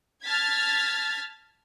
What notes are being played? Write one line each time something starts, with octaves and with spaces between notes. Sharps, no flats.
A5 F6 G#6 A6 B6